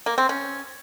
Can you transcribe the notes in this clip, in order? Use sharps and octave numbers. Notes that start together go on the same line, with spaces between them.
A#3
C4
C#4